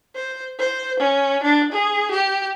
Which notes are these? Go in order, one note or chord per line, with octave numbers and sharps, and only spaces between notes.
C5
C5
C#4
D4
G#4
G4